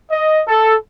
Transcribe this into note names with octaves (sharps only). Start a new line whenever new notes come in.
D#5
A4